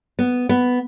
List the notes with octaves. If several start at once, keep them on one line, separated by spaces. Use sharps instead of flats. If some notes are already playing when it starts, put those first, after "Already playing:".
B3
B3